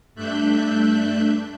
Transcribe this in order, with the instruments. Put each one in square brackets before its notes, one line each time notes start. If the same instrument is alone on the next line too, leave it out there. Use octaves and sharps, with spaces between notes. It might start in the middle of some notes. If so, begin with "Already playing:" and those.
[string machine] G2 A3 D4 E5 F#6 G6